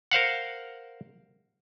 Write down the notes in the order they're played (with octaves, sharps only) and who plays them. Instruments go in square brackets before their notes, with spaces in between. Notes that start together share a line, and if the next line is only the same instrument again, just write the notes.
[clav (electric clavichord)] A#4 C5 F5 F#5